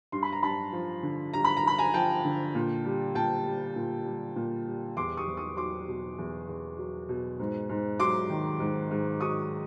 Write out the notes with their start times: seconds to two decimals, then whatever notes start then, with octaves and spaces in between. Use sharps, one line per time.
0.12 G2 C6
0.23 B5
0.33 A#5
0.43 G2 A5 B5
0.73 F3
1.03 D3
1.34 G2 A#5
1.44 B5
1.57 A#5
1.63 G2 B5
1.78 G#5 A#5
1.94 F3 G5 A5
2.25 D3
2.55 A#2
2.85 G3
3.15 A#2 G5 A5
3.46 G3
3.76 A#2
4.06 G3
4.36 A#2
4.67 G3
4.97 E2 C6 D6
5.17 C#6 D#6
5.27 E2
5.37 C#6 D#6
5.57 F#3 C6 D6
5.88 B2
6.18 E2
6.48 E2
6.78 F#3
7.09 B2
7.40 G#2
7.69 G#2
7.99 F#3 C6 D6
8.30 D#3
8.60 G#2
8.91 G#2
9.21 F#3 C#6 D#6